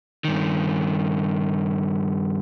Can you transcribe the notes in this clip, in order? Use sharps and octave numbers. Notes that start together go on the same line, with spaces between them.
G2 D#3